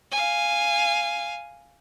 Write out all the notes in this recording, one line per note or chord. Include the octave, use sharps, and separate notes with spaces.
F5 G#5